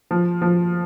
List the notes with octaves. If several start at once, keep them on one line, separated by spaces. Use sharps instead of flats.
F3
F3